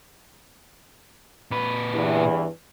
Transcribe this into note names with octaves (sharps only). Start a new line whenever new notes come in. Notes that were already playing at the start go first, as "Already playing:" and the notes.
A#2 B4
E2 G2 E3